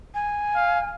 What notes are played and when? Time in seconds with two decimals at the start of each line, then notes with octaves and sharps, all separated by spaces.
0.14 G#5
0.55 F5